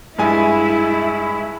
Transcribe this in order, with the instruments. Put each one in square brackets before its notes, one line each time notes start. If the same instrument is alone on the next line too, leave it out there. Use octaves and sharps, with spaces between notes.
[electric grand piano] G2 G#3 G#5 [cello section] E4